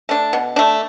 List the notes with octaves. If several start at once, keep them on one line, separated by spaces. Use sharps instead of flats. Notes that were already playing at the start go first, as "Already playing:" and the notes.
A3 D4
B2
A3 D4